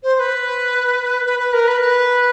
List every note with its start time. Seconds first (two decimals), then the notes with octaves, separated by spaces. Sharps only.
0.03 C5
0.15 C5
0.20 B4
1.25 B4
1.39 B4
1.53 A#4
1.67 B4
1.81 B4